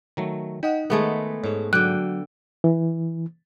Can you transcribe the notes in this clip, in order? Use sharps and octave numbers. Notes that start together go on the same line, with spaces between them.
D#3 F#3 A3
D#4 D#5 F#5 G5
D#3 G#3 A3 B3
G#2 G#4 A4 C#5
D3 F#3 F#4 G5 F#6
E3